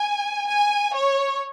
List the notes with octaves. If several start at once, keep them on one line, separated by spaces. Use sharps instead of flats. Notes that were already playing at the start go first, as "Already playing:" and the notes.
Already playing: G#5
G#5
C#5